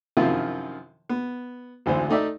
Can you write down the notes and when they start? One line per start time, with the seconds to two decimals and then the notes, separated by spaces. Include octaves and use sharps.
0.17 F#2 C3 D#3 F3 E4 F4
1.09 B3
1.86 G#1 D2 E3 C5
2.09 A3 D#4 D5 E5